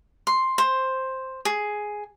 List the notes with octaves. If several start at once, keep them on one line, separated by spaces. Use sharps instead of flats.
C6
C5
G#4